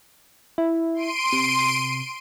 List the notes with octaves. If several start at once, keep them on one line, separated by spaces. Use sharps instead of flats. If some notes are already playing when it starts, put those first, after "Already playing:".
E4
C6 D7 D#7
C3